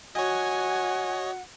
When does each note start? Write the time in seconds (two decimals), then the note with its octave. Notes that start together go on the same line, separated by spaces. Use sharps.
0.15 F#4 C#5 D#5 F#5 G#5